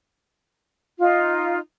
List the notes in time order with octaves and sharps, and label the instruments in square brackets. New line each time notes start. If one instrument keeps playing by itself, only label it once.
[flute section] D#4 F4